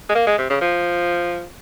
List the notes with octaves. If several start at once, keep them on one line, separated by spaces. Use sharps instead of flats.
G#3
A#3
G#3
C3
C#3
F3